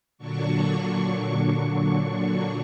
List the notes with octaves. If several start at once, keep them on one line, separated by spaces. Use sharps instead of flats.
A#2 D3 F#3 D4 C#6